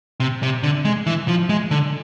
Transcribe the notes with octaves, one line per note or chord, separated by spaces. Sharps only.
C3
C3
D3
G#3
E3
F3
G#3
D3